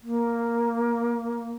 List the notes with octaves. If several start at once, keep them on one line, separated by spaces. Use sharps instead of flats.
A#3